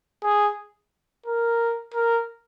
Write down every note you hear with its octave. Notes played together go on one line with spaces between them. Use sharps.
G#4
A#4
A#4